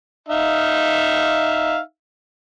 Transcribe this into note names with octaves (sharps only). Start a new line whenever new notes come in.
D#4 E5 F5